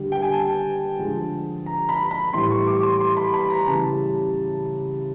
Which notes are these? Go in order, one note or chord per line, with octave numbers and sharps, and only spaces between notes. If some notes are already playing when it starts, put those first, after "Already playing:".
Already playing: D3 G3
G5
G#5
A5
D3 F3 G#3
A#5
B5
B5
A2 E3 G3 C6
C#6
D6
C6
C6
B5
B5
A#5
C#3 E3 G3 A5